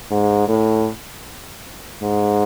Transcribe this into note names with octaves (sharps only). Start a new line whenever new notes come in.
G#2
A2
G#2